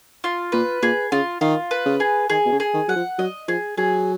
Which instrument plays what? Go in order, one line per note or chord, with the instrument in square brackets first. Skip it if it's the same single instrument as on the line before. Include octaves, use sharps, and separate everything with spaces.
[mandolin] F4
[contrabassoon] A#2 [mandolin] B4
[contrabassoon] A#2 [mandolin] G#4
[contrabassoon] C#3 [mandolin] F4
[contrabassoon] D#3 [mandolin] F4
[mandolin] B4
[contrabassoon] C#3
[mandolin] G#4
[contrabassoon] D#3 [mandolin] G#4
[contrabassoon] B2
C#3
[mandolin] G#4
[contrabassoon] D#3
[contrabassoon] F#3 [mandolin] F#5
[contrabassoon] F3
[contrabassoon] F#3 [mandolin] D#5
[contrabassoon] F3 [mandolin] G#4
[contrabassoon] F#3 [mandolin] G#4